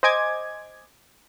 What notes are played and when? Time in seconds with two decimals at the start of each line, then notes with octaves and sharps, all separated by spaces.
0.03 C5 D#5 G#5 D6 G#6